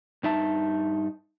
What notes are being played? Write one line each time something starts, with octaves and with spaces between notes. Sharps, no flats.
G2 D#4 E5 A5